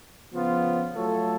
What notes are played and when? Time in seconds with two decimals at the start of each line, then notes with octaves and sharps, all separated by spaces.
0.33 C#3 F3 B3 F4
0.95 F#3 A3 F4 A4 C#5